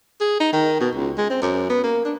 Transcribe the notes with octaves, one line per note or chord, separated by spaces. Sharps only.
G#4
D#4
D#3
B2
C#2
G#3
C4
F#2
B3
A#3
D4